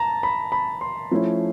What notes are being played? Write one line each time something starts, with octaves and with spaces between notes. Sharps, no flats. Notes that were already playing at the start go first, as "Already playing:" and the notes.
Already playing: A5 A#5
B5
B5
C6
F3 A3 C#4 E4